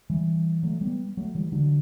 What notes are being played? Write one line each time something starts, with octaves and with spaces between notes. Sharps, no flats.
E3 G3
F#3 A3
G3 B3
F#3 A3
E3 G3
D3 F#3